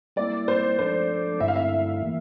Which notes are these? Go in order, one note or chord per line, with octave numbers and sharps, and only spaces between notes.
G3 A#3 E4 D5
C5
F3 A3 D4 A4 C5 D5
G2 D3 A3 E4 E5
F5
E5
E3 A#3